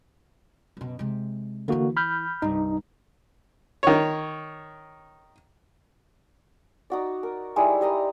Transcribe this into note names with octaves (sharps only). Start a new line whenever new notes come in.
F#2 B2
C3 G#3
D3 E3 A#3 E4 F#4
B5 F6 G6
C2 G2 D#4
D#3 C#5
D#4 F#4 D5
A#4
G3 G#3 D#4 E4
G3 D#5 A#5 C6